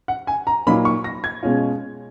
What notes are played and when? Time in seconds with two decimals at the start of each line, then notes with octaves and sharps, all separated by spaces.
0.08 F#5
0.27 G#5
0.47 A#5
0.67 A#2 F#3 A#3 D#4 B5
0.85 C#6
1.04 A#6
1.24 G#6
1.43 B2 G#3 C#4 F4